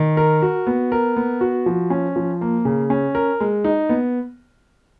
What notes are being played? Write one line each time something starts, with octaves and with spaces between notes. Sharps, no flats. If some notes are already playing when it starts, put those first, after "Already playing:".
Already playing: D#3
A#4
F#4
B3
A#4
B3
F#4
F3
C#4
F3
A#3
C#3
C#4
A#4
G#3
D#4
B3